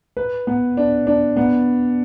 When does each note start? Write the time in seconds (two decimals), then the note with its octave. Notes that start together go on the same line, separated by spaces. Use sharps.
0.17 B4
0.47 B3
0.77 D4
1.07 D4
1.37 B3